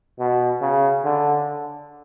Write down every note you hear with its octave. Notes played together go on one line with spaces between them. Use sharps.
B2
C#3
D3